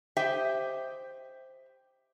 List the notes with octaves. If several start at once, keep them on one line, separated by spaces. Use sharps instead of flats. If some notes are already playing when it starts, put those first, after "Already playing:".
G4 C5 D#5 E5 G5